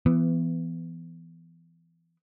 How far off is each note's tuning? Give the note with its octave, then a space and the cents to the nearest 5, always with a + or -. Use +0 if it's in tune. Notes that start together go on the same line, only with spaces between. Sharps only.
E3 +25 B3 +15